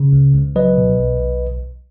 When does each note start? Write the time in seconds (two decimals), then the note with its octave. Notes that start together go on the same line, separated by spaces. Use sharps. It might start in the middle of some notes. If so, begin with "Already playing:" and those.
Already playing: C#3
0.13 C#2
0.34 C#2
0.56 F#3 B4 D#5
0.77 B2
0.99 B1
1.20 B1